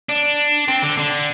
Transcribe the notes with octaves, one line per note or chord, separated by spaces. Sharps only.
D4
C4
D3
D3